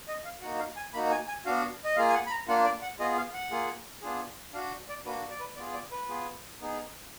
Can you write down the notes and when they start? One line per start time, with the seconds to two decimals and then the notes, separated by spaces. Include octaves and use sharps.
0.08 D#5
0.25 F5
0.42 F#4 F#5
0.45 A#3 D#4
0.59 F5
0.77 G#5
0.94 A#3 D#4 F#4 B5
1.11 G#5
1.28 G#5
1.45 B3 D4 F#4 F5
1.85 D#5
1.96 A#3 F4 G#4 F5
2.10 G#5
2.14 F#5
2.27 B5
2.31 A#5
2.48 A#3 D4 F4 F#5
2.65 D5
2.82 F#5
2.99 B3 F4 G#4 D#5
3.17 F5
3.33 F#5
3.51 A#3 F4 G#4
4.02 B3 D4 F4 G#4
4.53 D4 F#4 F5
4.89 D5
5.06 A#3 D4 F#4 B4
5.30 D5
5.40 B4
5.57 B3 F4 G#4 D5
5.74 D5
5.92 B4
6.08 B3 F4 G#4
6.60 B3 D#4 G#4